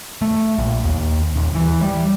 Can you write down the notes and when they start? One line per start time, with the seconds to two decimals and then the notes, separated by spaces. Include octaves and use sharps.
0.22 A3
0.59 A#1
0.84 D#2
1.36 D#1
1.55 E3
1.82 G3